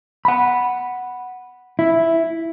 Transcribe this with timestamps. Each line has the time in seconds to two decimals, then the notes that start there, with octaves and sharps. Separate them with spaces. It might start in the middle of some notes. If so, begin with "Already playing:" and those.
0.25 F#5 B5
1.79 E4